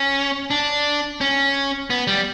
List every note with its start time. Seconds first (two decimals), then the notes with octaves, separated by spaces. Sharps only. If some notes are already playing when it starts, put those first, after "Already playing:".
Already playing: C#4
0.50 D4
1.21 C#4
1.90 B3
2.07 G3